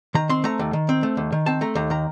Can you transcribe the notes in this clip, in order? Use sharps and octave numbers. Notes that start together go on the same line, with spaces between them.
D#3 A#5
C4 C6
A3 A#5
D#2
D#3
C4
A3
D#2
D#3
C4 A5
A3 A#5
D#2 A#5
D#3 A#5